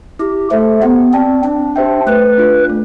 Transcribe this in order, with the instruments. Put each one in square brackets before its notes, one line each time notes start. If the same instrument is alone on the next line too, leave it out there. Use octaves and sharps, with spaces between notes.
[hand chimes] E4 [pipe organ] G4
[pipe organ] A3 [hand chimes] A4 C5
[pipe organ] B3 [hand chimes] G4
[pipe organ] C4 [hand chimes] D5 A5
[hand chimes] C4 [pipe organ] D4
[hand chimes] G4 C5 E5 G5
[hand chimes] A3 [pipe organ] B4
[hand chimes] D4 F4
A3